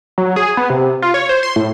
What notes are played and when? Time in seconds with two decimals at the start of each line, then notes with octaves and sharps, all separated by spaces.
0.18 F#3
0.36 G#4
0.57 B3
0.70 C3
1.02 F4
1.14 C#5
1.29 C5
1.43 C6
1.56 A2